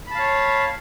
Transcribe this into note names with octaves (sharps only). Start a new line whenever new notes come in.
C#5 F5 A5 B5